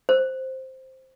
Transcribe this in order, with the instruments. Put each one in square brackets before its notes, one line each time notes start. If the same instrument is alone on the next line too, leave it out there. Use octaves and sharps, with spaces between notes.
[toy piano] C5